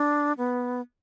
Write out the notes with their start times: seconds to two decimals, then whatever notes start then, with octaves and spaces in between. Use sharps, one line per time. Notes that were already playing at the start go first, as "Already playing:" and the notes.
Already playing: D4
0.38 B3